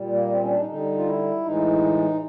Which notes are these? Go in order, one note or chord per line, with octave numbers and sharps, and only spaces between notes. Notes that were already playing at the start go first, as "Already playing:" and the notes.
Already playing: A#2 G3
A#3
C4
C#4
D4
D#4
D3 G3 D#4
F4
E4
A2 E3 G#3 D#4